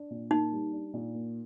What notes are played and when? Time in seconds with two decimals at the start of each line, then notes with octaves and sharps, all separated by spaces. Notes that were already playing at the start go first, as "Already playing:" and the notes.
Already playing: D4
0.11 A#2
0.31 A#3 D#4
0.52 G3
0.73 D4
0.94 A#2
1.14 A#3